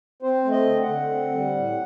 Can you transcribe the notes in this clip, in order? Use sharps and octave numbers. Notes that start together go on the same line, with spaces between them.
C4 C5
A3
D#5
D3
F#5
D3
C4
G3
A2